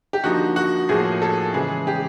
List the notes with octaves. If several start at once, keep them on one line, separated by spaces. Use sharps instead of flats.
G4
D3 F3 A#3 D#4 F#4
F#4
A2 F3 A#3 G#4
A4
C#3 E3 G#3 G#4
G4